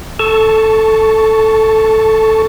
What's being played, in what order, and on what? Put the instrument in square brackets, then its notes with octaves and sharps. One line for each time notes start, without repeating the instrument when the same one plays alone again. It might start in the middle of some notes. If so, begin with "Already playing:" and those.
[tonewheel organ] A4 A5 C#6